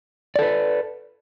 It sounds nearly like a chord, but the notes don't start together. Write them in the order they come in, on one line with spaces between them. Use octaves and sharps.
D5 A4 B4